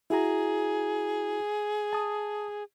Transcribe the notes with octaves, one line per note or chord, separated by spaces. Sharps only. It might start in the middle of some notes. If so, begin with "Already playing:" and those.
E4 F#4 G#4 A#5
A5 D#6